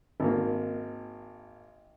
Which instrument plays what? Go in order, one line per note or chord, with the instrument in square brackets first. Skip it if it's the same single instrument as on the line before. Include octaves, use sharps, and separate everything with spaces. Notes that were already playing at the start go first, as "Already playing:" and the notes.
[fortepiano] G#1 A#3